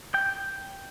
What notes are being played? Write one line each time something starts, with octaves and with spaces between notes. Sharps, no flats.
G5